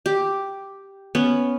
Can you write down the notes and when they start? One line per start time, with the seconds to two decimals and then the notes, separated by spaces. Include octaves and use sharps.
0.06 G4
1.15 B3 C#4